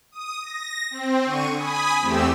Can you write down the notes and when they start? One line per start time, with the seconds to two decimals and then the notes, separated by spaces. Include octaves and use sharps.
0.11 D#6
0.41 A#6
0.91 C4
1.24 D3 C#6 D#7
1.54 G#5 B5 D#6
2.00 E2 A3 C4 G4 E6